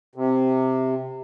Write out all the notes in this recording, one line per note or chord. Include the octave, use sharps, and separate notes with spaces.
C3